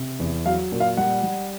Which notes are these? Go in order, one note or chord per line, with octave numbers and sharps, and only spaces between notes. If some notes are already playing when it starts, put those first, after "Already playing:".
Already playing: C3
E2
F#3 F5
A#2
F5
G3 F#5
G3